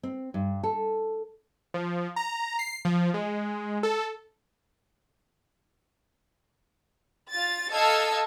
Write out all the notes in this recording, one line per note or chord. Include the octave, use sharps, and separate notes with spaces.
C4
G2
A4
F3
A#5
C7
F3
G#3
A4
F4 A6
A4 D#5 F5 A5 E6 G#6